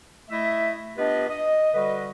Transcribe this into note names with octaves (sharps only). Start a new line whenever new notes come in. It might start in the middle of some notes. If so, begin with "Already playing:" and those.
A3 E4 D#5 E5
B3 D4 F4 G4 B4 D#5
D#5
D3 G3 F#4 B4 D#5